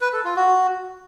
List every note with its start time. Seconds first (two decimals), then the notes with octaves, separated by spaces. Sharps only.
0.01 B4
0.13 A4
0.25 F4
0.36 F#4